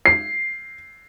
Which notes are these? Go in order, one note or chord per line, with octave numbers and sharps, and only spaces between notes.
C7